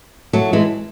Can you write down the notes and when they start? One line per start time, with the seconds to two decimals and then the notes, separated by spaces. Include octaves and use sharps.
0.33 F#3 A3
0.53 E3 G#3